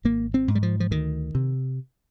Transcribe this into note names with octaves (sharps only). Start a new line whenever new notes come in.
G#1 A#3
C4
G#2
G3
F3
F3
D2 D#3
C3